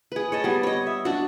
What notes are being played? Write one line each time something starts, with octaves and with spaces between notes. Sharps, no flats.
G#4 B4
C#5 D#5 A5
G3 B3
C#5 D#5
E5
D4 F#4